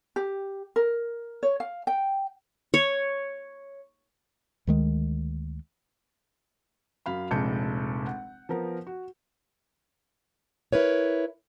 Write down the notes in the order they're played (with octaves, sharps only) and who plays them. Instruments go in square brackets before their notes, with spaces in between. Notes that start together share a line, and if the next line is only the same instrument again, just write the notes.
[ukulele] G4
A#4
C#5
F5
G5
[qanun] C#5
[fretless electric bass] D2 D#3 G#3
[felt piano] F#2 F5 B5
F1 A#1 G#3 A5 G6 C#7
F#5
F3 B3 A#4
F#4
[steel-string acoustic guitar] E4 A#4 B4 C#5